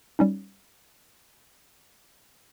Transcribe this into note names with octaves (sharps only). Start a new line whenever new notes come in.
G3 C#4 D#4